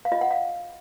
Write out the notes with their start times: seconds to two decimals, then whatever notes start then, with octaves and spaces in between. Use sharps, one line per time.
0.05 F5
0.12 F4 D#5
0.21 F#5
0.31 F5